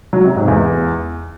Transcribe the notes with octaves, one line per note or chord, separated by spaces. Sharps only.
F#3
C3
G#2
E2